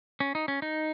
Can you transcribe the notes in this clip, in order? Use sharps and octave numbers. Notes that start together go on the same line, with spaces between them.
C#4
D#4
C#4
D#4